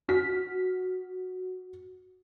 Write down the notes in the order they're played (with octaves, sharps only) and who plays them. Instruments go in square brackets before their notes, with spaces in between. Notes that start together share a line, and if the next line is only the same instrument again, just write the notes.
[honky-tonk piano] F#4 F6 B6